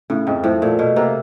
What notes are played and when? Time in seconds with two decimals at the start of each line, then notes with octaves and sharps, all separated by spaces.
0.10 A2 C#3
0.27 F2 G#2
0.44 A2 F3
0.61 A#2 A3
0.79 B2 A3
0.96 C3 A#3